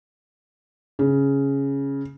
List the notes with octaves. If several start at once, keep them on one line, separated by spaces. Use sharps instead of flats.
C#3